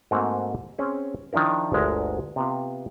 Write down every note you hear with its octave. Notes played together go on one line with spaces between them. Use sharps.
G#2 A3 A#3 C4 F#4
C4 C#4 G#4
D#3 F3 D4 E4 A#4
G1 D2 G#3 A#4 E5
C3 B3 F4